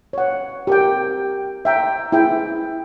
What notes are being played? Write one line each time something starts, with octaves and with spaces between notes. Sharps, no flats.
C#5 F#5
G4 A#4 G5
E5 G5 A#5
E4 G#4 E5 G5